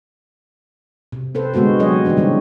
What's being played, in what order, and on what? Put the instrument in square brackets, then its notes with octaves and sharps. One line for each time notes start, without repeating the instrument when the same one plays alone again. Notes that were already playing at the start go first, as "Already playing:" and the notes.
[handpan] C3
C4 A4 B4 C5
D3 G#3 B3 F#4 C5
F#3 C4 G#4 C#5 D#5
D#3 E3 G3 C4 D4
C#3 E3 C4